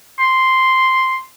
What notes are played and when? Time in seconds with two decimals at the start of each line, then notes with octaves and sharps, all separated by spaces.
0.19 C6